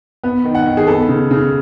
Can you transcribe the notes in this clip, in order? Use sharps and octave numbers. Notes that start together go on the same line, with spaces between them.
B3
D#3
F#5
D#3
G#4
B3 A4
C#3
C#3